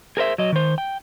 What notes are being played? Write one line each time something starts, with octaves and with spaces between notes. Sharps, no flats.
G#4 A#4 C5 E5
F#3 D#5
D#3 C5
G5